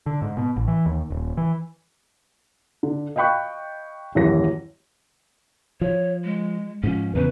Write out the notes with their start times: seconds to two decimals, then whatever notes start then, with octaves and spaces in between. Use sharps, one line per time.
0.06 D3
0.22 G#2
0.37 B2
0.56 A1
0.68 E3
0.86 D#2
1.10 D#1
1.37 E3
2.83 D3
3.16 D#5 F5 G5 B5 C#6 F#6
4.15 D#1 F#2 E3 C#5 A#6
5.81 F3 C#5
6.25 G#3
6.83 G#2 F3 C#4
7.15 E2 C#3 B4